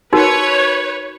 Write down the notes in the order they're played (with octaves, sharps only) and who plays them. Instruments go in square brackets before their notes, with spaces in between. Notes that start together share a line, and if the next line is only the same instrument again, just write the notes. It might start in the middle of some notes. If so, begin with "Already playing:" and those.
[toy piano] D#4 F#4 A#4 [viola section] B4 C#5